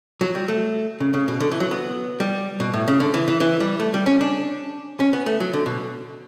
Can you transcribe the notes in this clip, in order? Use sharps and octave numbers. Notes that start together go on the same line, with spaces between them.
F#3
G3
A3
C#3
C#3
B2
D3
E3
F#3
B3
G3
B2
A2
C#3
D3
E3
E3
E3
G3
A3
G3
C#4
D4
C#4
B3
A3
F#3
D3
B2